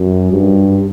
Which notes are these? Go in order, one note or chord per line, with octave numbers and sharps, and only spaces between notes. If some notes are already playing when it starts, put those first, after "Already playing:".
Already playing: F#2
G2